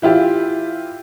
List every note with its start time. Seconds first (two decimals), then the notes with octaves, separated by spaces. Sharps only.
0.02 E3 E4 F4 G4